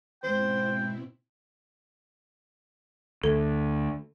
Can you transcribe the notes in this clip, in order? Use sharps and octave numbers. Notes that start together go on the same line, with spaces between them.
E2 G#2 B2 C4 E4 C5 G5
D2 A4